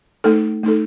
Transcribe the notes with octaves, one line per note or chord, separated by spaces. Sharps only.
A3 D#4 A4
A3 D#4 A4